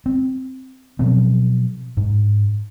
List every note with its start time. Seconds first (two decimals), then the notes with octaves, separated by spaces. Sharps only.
0.06 C4
0.99 B2 F3 F#3 C4
1.97 G#2